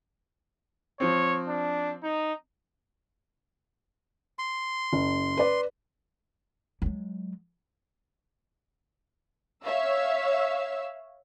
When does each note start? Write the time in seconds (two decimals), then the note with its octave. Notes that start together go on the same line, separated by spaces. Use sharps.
1.00 F3 C4 C#5
1.48 D4
2.03 D#4
4.39 C6
4.93 F#1
5.37 B4 D5
6.82 F#3 G#3
9.65 C#5 E5 F5 E6